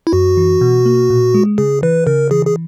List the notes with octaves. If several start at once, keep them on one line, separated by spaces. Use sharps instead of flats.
E4
F#2 F#4
E3
B2
A#3
A#2
G#3
C#3 G#4
E3 B4
C#3 A#4
E3 G#4
G#4